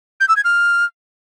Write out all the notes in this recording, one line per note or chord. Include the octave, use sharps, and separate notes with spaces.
G6
E6
G#6
F6